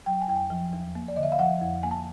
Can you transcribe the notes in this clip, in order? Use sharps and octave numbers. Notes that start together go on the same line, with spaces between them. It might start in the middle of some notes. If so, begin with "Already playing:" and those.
F#3 G5
G#5
F2 G5
G#5
F3
E2
A#3
D5
D3 D#5
E5
F5
F3 F#5
F2
A#3 G#5
A5